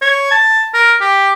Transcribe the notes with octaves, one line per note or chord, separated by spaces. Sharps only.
C#5
A5
A#4
G4